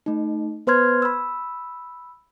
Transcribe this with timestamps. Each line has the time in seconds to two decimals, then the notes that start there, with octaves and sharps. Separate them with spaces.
0.06 A3 D#4
0.67 B3 B4 C5 C6 F6 G#6
1.02 B5 E6